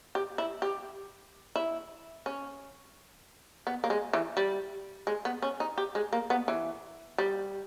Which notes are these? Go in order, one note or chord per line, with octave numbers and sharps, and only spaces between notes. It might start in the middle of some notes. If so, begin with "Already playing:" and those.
G4
E4
G4
E4
C#4
B3
A#3
G#3
E3
G3
G#3
B3
C#4
D#4
G4
G#3
A#3
B3
E3
G3